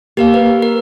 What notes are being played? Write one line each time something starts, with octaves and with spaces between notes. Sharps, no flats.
A#3 G4 A#4 F5
B4
A#4